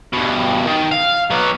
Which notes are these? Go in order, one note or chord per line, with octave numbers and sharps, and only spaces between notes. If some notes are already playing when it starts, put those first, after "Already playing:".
G2 B2
D#3
F5
F#3 B3